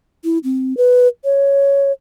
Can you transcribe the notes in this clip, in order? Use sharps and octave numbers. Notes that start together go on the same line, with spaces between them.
E4
C4
B4
C#5